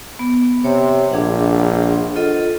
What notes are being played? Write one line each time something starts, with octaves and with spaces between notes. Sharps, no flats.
B3
C3 C#5
A#1 D4 G#4 F#5
F4 A4 D#5